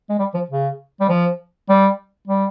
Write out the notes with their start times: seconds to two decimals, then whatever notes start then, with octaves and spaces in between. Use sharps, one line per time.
0.10 G#3
0.19 G3
0.34 F3
0.50 C#3
1.00 G3
1.09 F3
1.69 G3
2.28 G3